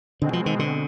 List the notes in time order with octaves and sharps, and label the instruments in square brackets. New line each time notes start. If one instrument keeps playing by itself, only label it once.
[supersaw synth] B2 G#3 C4 [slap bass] D3
[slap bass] F3
D#3
D3